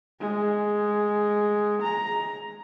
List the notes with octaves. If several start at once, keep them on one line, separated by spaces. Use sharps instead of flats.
G#3
A#5